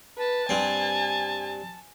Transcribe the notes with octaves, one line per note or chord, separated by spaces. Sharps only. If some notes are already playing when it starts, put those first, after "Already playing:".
B4 A5
G2 C4 G#5